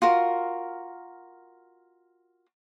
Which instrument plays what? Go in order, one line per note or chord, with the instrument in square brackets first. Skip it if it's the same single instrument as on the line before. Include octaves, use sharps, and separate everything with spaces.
[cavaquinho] F4 F#4 A#4